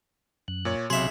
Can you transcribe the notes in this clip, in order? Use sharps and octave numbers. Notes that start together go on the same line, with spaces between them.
F#2 F#6
A#2 C#5
B1 C3 F#3 G#4 E5 C6 F#6